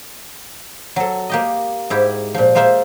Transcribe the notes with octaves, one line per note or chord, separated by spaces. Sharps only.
F#3 A4
A#3 G4 D#5
G#2 E4 G4
A#2 F3
G#3 A#3 F4 C5 E5